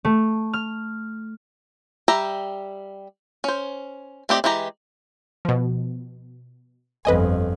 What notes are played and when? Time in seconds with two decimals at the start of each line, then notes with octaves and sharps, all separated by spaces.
0.05 A3
0.54 F6
2.08 G3 G4 E5 A#5
3.44 C#4 C5
4.29 A3 C4 G4 D5 D#5
4.44 E3 G#3 F4 G4 A#5
5.45 B2 F3
7.05 G1 F2 B4 D#5 G#5